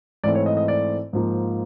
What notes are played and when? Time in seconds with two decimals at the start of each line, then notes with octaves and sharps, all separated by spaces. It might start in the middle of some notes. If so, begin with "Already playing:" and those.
0.24 G#2 E3 A3 C4 D5
0.35 C#5
0.46 D#5
0.57 D#5
0.68 D5
1.13 G#2 F3 A#3